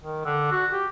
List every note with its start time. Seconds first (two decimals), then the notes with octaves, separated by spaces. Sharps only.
0.03 D#3
0.25 D3
0.52 F#4
0.72 G4